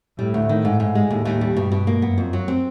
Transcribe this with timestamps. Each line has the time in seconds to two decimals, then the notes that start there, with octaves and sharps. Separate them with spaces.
0.19 A2 G3
0.34 D2
0.49 D#3
0.65 G#2
0.80 G#2
0.95 G#3
1.10 D#2 A2
1.25 D#2
1.41 G3
1.56 G2 B2
1.72 B2
1.87 A#3
2.02 F#2 B3
2.18 F2
2.33 F#3
2.48 C4